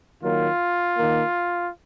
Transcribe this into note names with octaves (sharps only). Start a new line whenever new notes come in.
D#3 F#3 A#3 F4
D#3 A#3